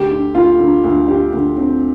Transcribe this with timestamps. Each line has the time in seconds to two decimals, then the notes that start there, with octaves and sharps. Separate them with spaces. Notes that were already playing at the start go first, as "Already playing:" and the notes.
Already playing: D2 G4
0.11 D3
0.34 D2 F4
0.59 D3
0.84 D2
1.08 D3 G4
1.33 D2
1.57 D3 C4